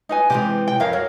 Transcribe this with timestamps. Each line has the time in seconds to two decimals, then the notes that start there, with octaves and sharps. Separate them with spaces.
0.09 D#4 B4 G#5
0.30 C3 E3 G#3 G4
0.68 G5
0.80 F2 A#4 C#5 F5
0.93 F#3 A#4 C#5